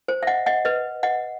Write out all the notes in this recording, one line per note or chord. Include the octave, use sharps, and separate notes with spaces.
C5
E5
D#5 F#5
D#5 F#5
B4 D#5
D#5 F#5